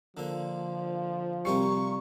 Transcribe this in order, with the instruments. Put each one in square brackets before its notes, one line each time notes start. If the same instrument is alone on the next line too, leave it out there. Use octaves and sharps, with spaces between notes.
[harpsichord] D3 A#3 [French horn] F3
[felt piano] C3 G4 C#7 [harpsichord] G3 F4 A#4 [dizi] C#6